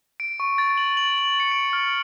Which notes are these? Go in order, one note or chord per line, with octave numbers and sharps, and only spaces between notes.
D7
C#6
A6
F#7
F#7
F#7
C#7
D7
F6